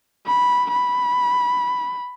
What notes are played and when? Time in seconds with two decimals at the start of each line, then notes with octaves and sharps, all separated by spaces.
0.28 B5
0.73 B5